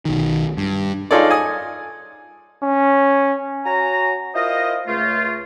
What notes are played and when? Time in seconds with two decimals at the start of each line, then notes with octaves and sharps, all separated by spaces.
0.05 B1 D#3
0.57 G2
1.11 D#4 F4 G#4 A4 C#5 D5
1.30 G#5 D#6
2.64 C#4
3.65 F#4 C#5 G#5 A#5
4.35 E4 F4 A#4 C5 D#5
4.87 C#2 A3 F4